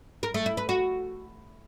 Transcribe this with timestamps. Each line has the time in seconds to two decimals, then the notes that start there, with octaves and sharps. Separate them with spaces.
0.23 A#4
0.34 A3
0.46 E4
0.57 B4
0.69 F#4